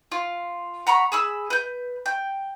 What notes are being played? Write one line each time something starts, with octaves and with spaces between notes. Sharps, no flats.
F4
F#5 A#5 B5 C#6
G#4 B5 E6
B4 G6
G5